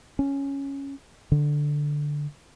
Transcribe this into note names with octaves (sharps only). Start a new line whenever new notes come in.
C#4
D3